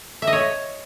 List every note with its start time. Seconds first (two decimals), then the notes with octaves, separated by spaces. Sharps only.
0.22 E5
0.27 D#5
0.33 C#5